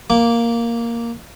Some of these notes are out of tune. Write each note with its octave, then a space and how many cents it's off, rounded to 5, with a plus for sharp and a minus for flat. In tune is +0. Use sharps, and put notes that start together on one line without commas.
A#3 +0 D6 -20